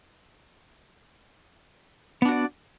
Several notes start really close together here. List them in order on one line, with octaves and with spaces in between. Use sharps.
B3 D4 F#4 D5